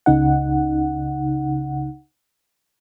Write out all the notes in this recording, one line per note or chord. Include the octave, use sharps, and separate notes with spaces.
C#2 C#3 D#4 F#5